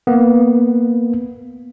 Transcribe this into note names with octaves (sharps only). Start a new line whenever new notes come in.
A#3 B3